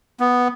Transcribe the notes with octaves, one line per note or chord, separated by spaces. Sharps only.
B3